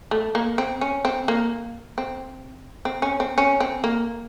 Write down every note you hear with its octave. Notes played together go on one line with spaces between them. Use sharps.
A3
A#3
C4
C#4
C4
A#3
C4
C4
C#4
C4
C#4
C4
A#3